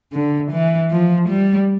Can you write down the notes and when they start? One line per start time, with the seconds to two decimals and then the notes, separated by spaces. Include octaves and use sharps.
0.13 D3
0.51 E3
0.91 F3
1.29 G3